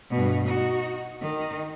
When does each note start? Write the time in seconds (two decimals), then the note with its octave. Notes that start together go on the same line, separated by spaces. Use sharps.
0.11 G2 B2
0.46 D#4 F#4
1.22 D#3